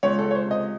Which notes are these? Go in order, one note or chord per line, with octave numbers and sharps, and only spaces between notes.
C#2 C#5
A4
C#2
C#5
C5
C3
D#5